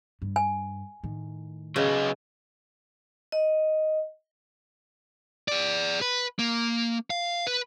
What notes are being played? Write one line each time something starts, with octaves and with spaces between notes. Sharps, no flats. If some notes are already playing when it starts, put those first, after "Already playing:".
G2
G#5
A2 D#3
C#3 F#3 B4 D#5
D#5
G#4 D5
B4
A#3
F5
B4